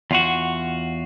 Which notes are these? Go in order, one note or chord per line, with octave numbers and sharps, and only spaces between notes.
E2 F4 F#4